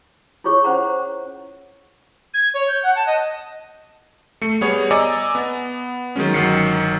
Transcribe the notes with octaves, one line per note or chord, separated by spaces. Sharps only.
E4 F4 G#4 C#5 C#6
C#4 C5 F#5 A#5
G#6
C#5
G6
F#5
A5
D#5
A3 C#7
G3 B3 G#4 C#5
D5 D#5 G#5 A#5 D6 E6
B3
D#3 F#3 G#3 C#4
G1 D#3 F#3 C7 C#7